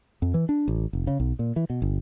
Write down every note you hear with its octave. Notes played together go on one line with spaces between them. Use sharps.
F2
E3
D4
A1
F1
C#3
B1
A#2
E3
B2
G1